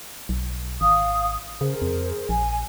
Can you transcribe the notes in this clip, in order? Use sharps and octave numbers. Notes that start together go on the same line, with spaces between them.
B1
G#1 F5 D#6
C#3 G#4 A#4 C5
F2
A#1 G#5